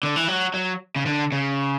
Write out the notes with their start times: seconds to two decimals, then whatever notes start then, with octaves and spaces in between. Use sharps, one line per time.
0.03 D3
0.16 E3
0.28 F#3
0.54 F#3
0.96 C#3
1.06 D3
1.32 C#3